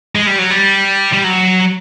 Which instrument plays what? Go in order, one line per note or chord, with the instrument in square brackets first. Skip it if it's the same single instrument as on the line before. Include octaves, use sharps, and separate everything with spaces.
[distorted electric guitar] G#3
G3
F#3
G3
G3
F#3